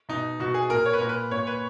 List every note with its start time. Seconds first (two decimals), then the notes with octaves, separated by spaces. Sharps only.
0.09 B2 D#4
0.40 B2 F#4
0.54 G#4
0.70 A#2 A#4
0.86 C#5
0.93 B4
1.01 A#2 A#4
1.09 B4
1.31 A#2 C#5
1.47 B4